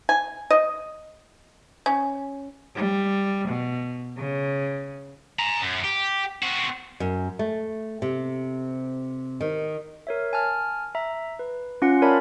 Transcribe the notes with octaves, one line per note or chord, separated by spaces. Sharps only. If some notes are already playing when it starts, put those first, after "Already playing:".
G#5
D#5
C#4
G3
B2
C#3
G#5 A#5
F#2
G4
C4 F#4
F#2
A3
C3
D#3
A#4 C#5 E5
G#5 A5 F6
E5 A#5
B4
C#4 F4 F5 F#5 C6 C#7
A#4 C#5 D5 E5 A5 B5